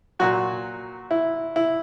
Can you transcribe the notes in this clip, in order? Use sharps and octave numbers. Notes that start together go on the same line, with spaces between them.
A#2 F#3 F#4
E4
E4